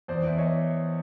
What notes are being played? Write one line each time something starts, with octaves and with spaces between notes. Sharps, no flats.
E2 C5 D5
E2 E5
C#5 D#5